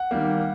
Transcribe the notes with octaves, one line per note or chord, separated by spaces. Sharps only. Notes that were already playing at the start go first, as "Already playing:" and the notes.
Already playing: F#5
D#3 G3 A#3